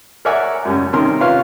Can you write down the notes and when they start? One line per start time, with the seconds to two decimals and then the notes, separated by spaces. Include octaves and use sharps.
0.25 A#4 C#5 D5 E5 F#5 G#5
0.65 F#2 G3 C#4
0.93 C3 D#3 C#4 A#4 C6
1.20 F4 B4 C#5 F5